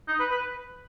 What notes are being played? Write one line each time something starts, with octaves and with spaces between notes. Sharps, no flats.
D#4
B4
B4